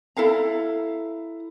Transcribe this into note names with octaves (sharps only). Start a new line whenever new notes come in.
E4 A4 F5 A#5